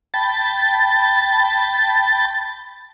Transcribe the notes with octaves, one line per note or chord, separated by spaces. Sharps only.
G5 A5 B5 A6